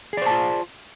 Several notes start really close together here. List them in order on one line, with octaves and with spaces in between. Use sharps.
G#4 D5 C5 A5 F4